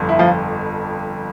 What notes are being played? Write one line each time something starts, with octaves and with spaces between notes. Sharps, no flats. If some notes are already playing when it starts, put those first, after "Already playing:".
Already playing: G1 F2
E4
F3 F4